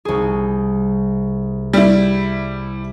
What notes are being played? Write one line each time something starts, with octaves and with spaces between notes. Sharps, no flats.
C2 G#4
G3 E4